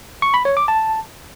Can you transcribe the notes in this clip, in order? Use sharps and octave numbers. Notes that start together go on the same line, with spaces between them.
C#6
B5
C#5
D6
A5